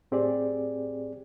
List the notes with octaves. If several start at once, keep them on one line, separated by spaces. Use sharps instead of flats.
A2 C4 G4 G#4 D5